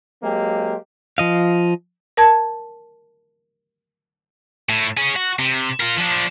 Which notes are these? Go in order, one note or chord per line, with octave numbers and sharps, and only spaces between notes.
F#3 G#3 A#3 C4 G4
F3 D#5 F5
A#4 A5 G#6
A2
C#4 G#4
F#4
C3
F4 A#4
F3 D4